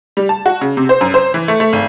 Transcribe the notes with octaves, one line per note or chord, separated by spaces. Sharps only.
G3
A5
F#4
C#3
C3
C5
F#2
C5
E3
A3
A3
G#1